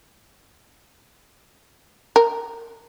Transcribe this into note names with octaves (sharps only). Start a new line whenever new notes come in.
A#4